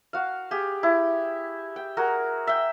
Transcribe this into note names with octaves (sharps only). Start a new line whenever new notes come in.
F#4 F5
G4 G#4
E4
G5
F#4 G#4 A#4
E5 G5